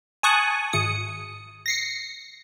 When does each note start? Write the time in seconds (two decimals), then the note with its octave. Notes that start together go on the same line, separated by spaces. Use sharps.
0.23 G#5 A5 C#6 D#6 F#6
0.73 G#1 D#6 C#7
1.66 A#6 C7 C#7